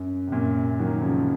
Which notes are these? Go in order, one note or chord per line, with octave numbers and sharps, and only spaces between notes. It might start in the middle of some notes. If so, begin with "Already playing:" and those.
Already playing: F#2
C3
F#2 A#2
D#3 F#3
C#3 F3